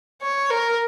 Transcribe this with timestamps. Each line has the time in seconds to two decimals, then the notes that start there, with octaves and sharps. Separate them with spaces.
0.22 C#5
0.50 A#4